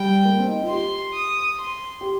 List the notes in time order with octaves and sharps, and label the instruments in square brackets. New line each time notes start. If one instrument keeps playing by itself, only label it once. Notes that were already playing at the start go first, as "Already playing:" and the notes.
Already playing: [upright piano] G3 [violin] G5
[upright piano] A#3
C4
D#4
F4
[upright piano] G4 [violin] C6
[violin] D#6
C6
[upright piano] G4